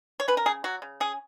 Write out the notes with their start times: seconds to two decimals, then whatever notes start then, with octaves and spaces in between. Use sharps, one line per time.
0.20 C#5
0.28 C#4 B4
0.37 A#4
0.46 C#3 G#4
0.64 F#3 F#4
0.82 C#3
1.00 C#4 G#4